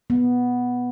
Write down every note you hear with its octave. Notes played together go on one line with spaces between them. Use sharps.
B3